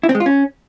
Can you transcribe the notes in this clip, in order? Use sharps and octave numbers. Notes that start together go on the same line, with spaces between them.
E4
C4
G#3
F4
C#4